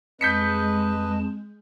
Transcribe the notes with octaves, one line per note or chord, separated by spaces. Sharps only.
F2 G#3 B4 D#5 A5 G6 B6 C#7